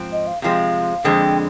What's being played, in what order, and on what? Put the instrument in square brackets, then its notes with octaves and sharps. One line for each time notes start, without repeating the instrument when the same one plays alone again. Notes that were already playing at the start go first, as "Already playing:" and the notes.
Already playing: [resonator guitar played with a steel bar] G#2 F3 C4
[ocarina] D#5
F5
[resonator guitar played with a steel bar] C3 F3 G#3 C4 [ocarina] F5
[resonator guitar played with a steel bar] F2 D3 G#3 C4 [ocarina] G5